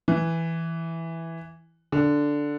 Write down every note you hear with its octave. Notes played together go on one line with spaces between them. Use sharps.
E3
D3